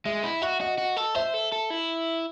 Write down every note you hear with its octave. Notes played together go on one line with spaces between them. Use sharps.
G#3 E5
E4
F#4 E5
F#4 D#5
F#4
A4
C5 E5
A4
A4
E4